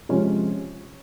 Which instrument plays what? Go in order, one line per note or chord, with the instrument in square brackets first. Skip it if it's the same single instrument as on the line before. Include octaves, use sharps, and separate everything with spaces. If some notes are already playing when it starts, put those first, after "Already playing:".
[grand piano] C3 F3 G#3 C#4 F4 C#5